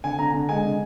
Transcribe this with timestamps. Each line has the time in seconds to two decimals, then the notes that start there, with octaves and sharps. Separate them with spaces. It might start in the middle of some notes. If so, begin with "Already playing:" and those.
0.04 D3 G#5
0.19 D3 A#5
0.34 D3
0.49 G#3 G#5
0.64 D3